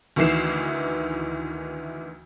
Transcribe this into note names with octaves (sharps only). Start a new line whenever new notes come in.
D2 D#3 E3 C7 E7